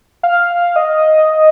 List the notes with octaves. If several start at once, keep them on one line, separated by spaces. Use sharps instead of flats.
F5
D#5